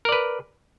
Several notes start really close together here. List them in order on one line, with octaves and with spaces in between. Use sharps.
A#4 D5 B4